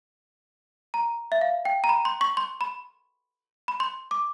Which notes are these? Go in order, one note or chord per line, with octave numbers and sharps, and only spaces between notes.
A#5
E5
F5
G5
A#5
B5
C6
C#6
C6
B5
B5
C6
D6